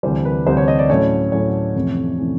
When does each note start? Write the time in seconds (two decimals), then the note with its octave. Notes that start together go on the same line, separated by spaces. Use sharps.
0.03 D2 C3 E3 G3 C5
0.25 B4
0.46 D2 C3 E3 G3 C5
0.57 C#5
0.68 D#5
0.79 D5
0.89 A2 F#3 A3 C#4 C#5
1.32 A2 F#3 A3 C#4 C#5
1.75 F2 C3 E3 A3 C#4
2.18 C3 E3 A3 C#4